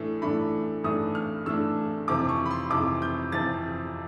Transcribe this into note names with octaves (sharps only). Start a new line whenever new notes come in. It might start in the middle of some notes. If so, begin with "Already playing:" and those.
Already playing: A2 E3 A3 D4
A2 E3 A3 D4 B5
A2 E3 A3 D4 D#6
F6
A2 E3 A3 D4 E6
F2 C3 E3 D6
C#6
B5
C6
F2 C3 E3 D6
G6
F2 C3 E3 A6